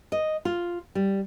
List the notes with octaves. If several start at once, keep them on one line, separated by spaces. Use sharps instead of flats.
D#5
F4
G3